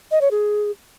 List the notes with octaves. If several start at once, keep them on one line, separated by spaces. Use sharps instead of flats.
D#5
C#5
G#4